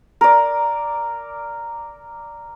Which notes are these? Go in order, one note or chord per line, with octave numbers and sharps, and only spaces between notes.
A#4 D5